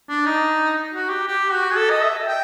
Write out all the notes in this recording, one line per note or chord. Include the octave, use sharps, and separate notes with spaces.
D4
D#4
F#4
G4
G4
F#4
G#4
A4
D#5
E5
G5